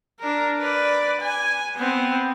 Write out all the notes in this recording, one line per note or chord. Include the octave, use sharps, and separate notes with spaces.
D4 A#4
B4 D5
G#5
B3 C4